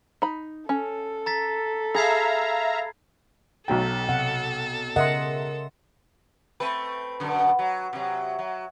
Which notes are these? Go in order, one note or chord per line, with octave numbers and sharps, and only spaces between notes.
D#4 B5
C#4 A4
A#5 A6 B6
G#4 E5 F5 A#5 B5 G#6 C7
B1 F#3 A4 G5 A6
C3 F#5
C#3 A#4 D#5 E5 F#5 C6
A3 C4 B4
F#2 B2 D3
F#3
C3 F#3
F#3